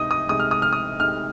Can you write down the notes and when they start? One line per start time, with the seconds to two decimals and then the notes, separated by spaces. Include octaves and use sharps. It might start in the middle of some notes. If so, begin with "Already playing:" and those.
Already playing: C3 G#3 D#4 D#5 D#6
0.11 D#6
0.29 C3 G#3 D#4 D#6
0.40 F6
0.51 D#6
0.62 F6
0.73 D#6
1.00 C3 G#3 D#4 F6